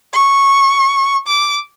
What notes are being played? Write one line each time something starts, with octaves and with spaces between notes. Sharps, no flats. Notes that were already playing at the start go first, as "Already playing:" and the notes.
C#6
D6